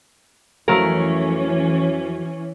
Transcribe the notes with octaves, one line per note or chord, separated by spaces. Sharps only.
F2 E3 F#3 A3 C#4 A#4 A#5